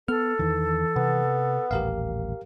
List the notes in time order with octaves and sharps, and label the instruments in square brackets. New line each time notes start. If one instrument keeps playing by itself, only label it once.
[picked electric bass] B3 [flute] A4 [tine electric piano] F6
[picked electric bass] E2 D#3 [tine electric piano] E3
[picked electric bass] C3 [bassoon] B3
[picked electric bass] D#1 A1 [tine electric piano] G4 A#4 F5